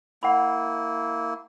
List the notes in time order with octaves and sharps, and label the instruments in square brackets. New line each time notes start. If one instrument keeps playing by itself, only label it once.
[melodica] A#3 E4 [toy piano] F#5 B5